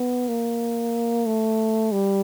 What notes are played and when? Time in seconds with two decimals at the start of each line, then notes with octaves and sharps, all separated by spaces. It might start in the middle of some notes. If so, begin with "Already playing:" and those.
Already playing: B3
0.28 A#3
1.26 A3
1.92 G3